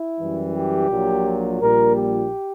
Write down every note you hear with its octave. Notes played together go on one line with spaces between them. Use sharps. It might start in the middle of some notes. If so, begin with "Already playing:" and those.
Already playing: E4
F#2 E3 G3
G4
A#1 A#2 F#3
A#1 A#2 G3 A#4
G4